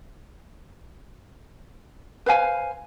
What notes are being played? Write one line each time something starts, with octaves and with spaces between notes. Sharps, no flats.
B4 C5 F5 G#5